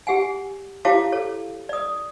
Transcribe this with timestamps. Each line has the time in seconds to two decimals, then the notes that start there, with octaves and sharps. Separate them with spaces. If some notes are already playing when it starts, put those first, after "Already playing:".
0.07 G4 G#4 F#5 G#5
0.85 E4 G4 C#5 F5 A5 D6
1.12 A4 C#5
1.69 D5 D#6